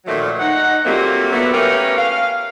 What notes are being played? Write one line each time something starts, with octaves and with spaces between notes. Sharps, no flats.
A#2 D#3 F3 F#3 A3
D#4 F#5
F#3 G3 A3 A#3 C4 F4
D3 F#3 A3 B3
A3 A#3 C#4 G4 A#4 B4
F5